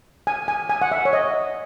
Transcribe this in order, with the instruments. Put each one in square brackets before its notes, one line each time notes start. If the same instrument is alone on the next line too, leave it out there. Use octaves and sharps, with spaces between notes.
[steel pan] G#5
G#5
G#5
F#5
E5
C#5
D#5